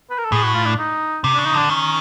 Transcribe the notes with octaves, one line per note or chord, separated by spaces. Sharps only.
B4
A#4
A4
A2 G#4
F#4
F4
D4
D#4
C3
C#3 D4
D#4
D3 D4
D#3 C#4